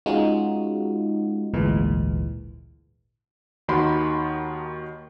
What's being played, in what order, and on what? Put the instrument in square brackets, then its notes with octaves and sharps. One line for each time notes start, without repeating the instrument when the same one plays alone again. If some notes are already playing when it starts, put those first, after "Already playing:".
[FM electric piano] G#3 C#4 D#4 F4 F#4
G#1 D2 A#2 E3 G#3
[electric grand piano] D#2 D#3 F#4 A#4 B5 C6